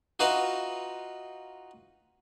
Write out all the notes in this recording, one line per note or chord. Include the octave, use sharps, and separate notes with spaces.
D#4 F4 F#4 B4 E5 F5